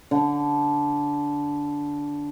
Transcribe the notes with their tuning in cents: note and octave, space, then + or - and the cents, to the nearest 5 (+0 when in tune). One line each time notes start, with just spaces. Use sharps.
D3 -15